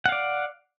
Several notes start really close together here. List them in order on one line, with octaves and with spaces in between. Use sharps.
F#5 F5 D5